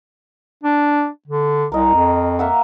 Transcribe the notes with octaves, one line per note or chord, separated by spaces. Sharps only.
D4
D3
C2 A#4 D#5
F2
A#3 E5 F#5